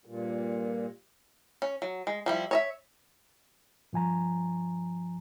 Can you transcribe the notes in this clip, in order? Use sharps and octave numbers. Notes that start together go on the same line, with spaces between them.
G2 A#2
C#4
F#3
G#3
F3 G3 E4
C#5 D#5 E5
G2 F3 G#5 A#5